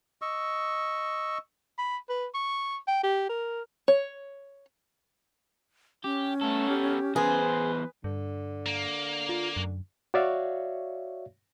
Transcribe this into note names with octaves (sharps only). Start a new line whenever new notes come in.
D#5 C#6 E6
B5
B4
C#6
G5
G4
A#4
C#5
C#4 G4
A3 B3 A4
G4
E2 G#4 B4 C5
G2 D3
A#3
F4
F#2
F#4 C#5 D5 E5 F5